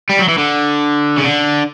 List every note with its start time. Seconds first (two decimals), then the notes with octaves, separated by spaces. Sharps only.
0.09 G3
0.19 F#3
0.28 E3
0.38 D3
1.18 C#3
1.25 D3